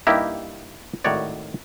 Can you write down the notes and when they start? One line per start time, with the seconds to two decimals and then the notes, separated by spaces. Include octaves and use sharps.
0.07 G2 A#3 D#4 E4 G4
1.04 G#1 A2 D#3 F#4 C#5 D5